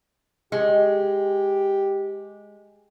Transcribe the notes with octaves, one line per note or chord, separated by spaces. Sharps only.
G#3 G4